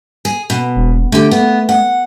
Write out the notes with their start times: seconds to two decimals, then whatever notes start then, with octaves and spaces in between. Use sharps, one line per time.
0.25 G#4
0.50 B2
0.76 E1
1.12 D3 A3 G4
1.31 B3
1.69 F#5